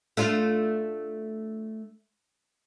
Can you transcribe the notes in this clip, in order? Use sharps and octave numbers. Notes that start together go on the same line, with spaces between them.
A3 D4 F4